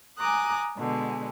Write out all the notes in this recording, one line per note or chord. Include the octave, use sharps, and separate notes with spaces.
G#5 A#5 D6 D#6 F#6
B2 D3 G#3